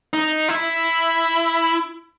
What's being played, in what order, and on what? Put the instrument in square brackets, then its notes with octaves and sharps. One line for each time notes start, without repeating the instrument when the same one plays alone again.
[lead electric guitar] D#4
E4